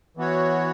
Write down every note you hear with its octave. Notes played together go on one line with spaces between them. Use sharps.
E3 B3 F#4 C#5